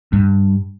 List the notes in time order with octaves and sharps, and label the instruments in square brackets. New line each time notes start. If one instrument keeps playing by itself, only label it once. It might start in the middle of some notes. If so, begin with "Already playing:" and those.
[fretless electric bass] G2